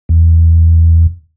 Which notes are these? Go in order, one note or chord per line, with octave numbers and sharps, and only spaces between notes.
E2